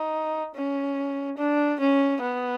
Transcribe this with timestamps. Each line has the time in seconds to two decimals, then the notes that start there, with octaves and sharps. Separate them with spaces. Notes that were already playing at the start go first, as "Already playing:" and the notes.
Already playing: D#4
0.55 C#4
1.38 D4
1.80 C#4
2.21 B3